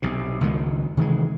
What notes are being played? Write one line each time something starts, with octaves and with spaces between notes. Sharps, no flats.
B1 C3
F#1 C#2 D#3 G#3
C3 D#3 E3 G#3